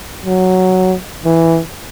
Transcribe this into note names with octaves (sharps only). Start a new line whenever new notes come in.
F#3
E3